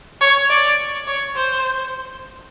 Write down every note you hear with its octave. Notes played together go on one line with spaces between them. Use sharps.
C#5
D5
C#5
C5